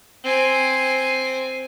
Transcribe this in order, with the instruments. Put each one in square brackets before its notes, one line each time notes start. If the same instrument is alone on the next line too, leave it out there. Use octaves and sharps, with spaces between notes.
[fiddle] C4 G#5